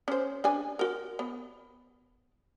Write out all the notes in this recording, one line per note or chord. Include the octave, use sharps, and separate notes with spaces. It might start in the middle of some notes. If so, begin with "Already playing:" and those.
C#4 C5
D4 B4 G#5
F#4 A#4
B3